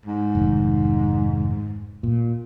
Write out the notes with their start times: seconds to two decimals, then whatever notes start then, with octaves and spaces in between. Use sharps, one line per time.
0.06 G#2
0.35 F1 D#3
2.03 A#2